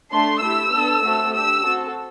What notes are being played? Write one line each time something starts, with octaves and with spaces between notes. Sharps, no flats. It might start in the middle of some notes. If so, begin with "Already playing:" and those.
A3 D4 A4 C6
A3 E4 G4 E6
B3 D4 A4
A3 C4 F#4 A4
D4 G4 E6
C4 F#4 A4